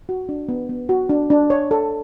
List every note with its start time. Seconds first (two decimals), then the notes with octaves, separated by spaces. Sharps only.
0.09 F#4
0.29 D4
0.49 B3
0.69 B3
0.89 F#4
1.09 D4
1.30 D4
1.50 C#5
1.71 A4